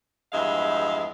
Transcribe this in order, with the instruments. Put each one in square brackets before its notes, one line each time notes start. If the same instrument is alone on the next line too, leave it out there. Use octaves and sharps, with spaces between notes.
[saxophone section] E2 G2 F3 G#3 E5 F5